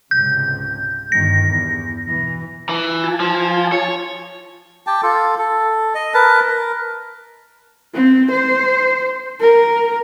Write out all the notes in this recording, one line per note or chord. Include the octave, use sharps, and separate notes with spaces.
C#2 G#2 C3 G6
G1 G2 D#3 A#6
E2 G2
B2 E3
E3
F4 G#5 A5
F3
C#5
G4 G5 A5
F4 A4
A4
D#5
A#4 B4 A5
A#4
C4
C5
A#4